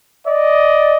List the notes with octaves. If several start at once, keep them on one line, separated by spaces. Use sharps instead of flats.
D5 D#5